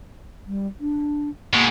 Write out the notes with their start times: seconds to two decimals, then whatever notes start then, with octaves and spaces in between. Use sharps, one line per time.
0.47 G3
0.80 D4
1.53 B2 G#3 A#3